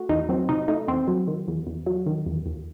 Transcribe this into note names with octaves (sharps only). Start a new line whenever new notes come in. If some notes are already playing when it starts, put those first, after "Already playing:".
Already playing: A3 F#4
E2 D#4
F#3 C4
C3 D#4
A3 D#4
E2 C4
F#3
D#3
E2
E2
F#3
D#3
E2
D#2